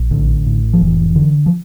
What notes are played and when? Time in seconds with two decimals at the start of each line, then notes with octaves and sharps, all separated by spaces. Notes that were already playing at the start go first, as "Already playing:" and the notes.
Already playing: A#1
0.11 A1 D3
0.46 A2
0.73 F3
0.81 F1 E3
1.16 D3
1.46 F3